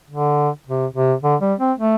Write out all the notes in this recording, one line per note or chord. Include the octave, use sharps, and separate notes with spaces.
D3
C3
C3
D3
G3
C4
A3